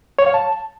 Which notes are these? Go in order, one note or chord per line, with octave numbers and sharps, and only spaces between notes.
C#5
F5
A5